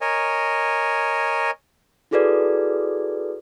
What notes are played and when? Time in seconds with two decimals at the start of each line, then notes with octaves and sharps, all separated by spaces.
0.01 A#4 C#5 D#5 G#5
2.11 E4 F#4 G#4 A4 B4 D5